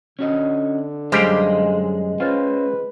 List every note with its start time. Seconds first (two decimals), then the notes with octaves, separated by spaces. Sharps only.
0.19 D3 C#4 F#4 D#5
1.12 F#2 G3 G#3 G4 C5 F5
2.20 C#4 F4 B4 C5